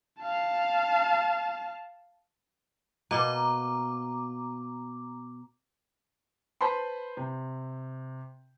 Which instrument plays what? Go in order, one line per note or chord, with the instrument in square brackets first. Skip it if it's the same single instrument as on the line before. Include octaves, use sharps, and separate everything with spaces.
[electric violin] F5 A5
[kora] B2 A#3 [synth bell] A#5 D6
[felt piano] B4 C5 A5 B5 C6
C3